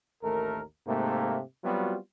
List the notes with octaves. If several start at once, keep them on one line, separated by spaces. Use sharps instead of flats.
A1 D#2 A3 A#4
G#2 C3 A3 A#3
F#3 G3 B3 C4 F4 F#4